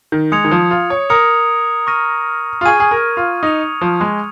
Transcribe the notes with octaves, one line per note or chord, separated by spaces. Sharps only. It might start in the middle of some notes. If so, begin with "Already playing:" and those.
D#3
G#3 D#6 G#6 C#7 F7
D#3
F3
F4
C#5
A#4 A#5 D#6 C#7 F7
C#6 F6 A#6 D#7
F4
G#4 C#6 F6 G#6 D#7
G#4
A#4
F4
D#4 D#6 C#7 F7
F3
G#3